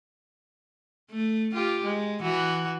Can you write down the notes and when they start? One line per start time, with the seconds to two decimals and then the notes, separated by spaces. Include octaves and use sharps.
1.12 A3
1.54 F4 G4
1.85 G#3
2.22 E3 F#4